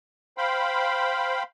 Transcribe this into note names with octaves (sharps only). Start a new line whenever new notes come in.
C5 F5 G5 B5